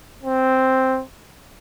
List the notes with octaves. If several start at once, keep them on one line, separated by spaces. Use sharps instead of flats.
C4